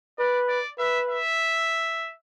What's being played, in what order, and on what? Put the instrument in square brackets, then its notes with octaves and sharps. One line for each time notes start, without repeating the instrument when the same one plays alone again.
[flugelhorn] B4 [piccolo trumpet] D5
[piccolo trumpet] D5
[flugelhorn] B4 [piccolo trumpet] E5
[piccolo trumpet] E5